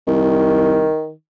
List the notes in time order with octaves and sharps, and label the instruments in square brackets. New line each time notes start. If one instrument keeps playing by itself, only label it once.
[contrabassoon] C2 [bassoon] D#3